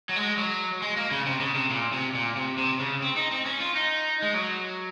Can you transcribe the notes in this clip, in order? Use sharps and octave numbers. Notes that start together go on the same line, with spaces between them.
F#3
G#3
F#3
G#3
A#3
C#3
C3
C#3
C3
A#2
C3
A#2
C3
C3
C#3
C4
D#4
C4
C#4
F4
D#4
G#3
F#3